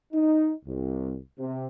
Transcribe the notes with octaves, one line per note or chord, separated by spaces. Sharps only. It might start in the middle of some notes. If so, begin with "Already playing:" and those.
D#4
C2
C3